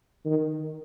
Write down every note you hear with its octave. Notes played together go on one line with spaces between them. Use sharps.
D#3